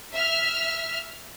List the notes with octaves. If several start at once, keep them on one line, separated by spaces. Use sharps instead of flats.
E5 F6